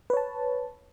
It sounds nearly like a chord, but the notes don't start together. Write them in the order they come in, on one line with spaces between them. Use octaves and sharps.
B4 C#5 A5